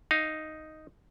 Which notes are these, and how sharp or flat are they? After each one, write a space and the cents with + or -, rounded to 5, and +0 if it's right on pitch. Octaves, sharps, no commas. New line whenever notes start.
D#4 +0 F5 +0